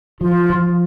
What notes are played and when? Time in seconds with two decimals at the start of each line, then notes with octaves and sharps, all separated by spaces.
0.21 F3 F4
0.50 F3